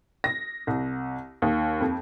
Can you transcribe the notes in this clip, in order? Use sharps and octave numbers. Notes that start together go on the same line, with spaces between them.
A#6
C2
D#2
F2